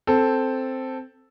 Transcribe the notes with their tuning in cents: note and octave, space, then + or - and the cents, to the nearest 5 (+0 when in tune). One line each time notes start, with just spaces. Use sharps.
C4 +0 A4 +0